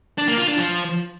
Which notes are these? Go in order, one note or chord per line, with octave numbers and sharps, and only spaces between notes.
D4
A#3
F4
D4
F3